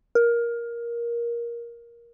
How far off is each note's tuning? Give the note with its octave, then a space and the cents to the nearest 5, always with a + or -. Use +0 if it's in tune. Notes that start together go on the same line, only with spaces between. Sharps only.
A#4 +15